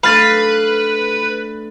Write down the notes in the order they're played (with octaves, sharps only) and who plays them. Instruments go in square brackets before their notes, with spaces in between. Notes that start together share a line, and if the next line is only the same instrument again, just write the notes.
[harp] A3 D4 [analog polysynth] B4 [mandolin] F5 [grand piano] B5 A6